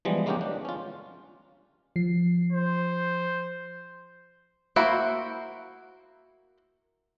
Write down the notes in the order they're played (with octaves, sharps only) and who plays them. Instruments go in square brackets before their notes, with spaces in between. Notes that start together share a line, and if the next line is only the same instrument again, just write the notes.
[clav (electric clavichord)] E3 F3 G3 G#3 B3
G#3 A#3 B3 C#4 D4 G4
D4
C#4 F4
[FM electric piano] F3 C7
[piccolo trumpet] C5
[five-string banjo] A#3 E4 F#4 C5